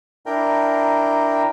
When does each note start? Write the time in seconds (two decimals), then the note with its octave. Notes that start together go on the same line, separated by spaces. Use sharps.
0.26 D4 E4 A#4 G5 A#5